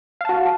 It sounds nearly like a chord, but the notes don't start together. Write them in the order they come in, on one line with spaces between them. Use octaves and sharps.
F5 A5 F#4